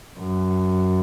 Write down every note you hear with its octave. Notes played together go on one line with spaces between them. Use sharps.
F#2